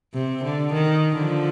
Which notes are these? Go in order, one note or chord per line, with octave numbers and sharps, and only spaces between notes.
C3
D3
D#3
D3 F3